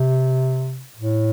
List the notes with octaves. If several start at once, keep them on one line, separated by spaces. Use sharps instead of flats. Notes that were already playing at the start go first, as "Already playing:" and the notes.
Already playing: C3
A2